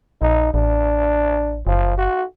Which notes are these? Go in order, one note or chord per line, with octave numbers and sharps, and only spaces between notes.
A#1 D#4
A1 D4
F#1 F3
F#4